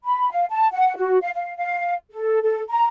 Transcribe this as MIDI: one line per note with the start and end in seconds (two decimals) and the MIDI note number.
0.05 0.29 83
0.31 0.44 77
0.50 0.68 81
0.73 0.96 78
0.96 1.17 66
1.22 1.30 77
1.35 1.56 77
1.57 1.93 77
2.11 2.42 69
2.43 2.60 69
2.70 2.88 82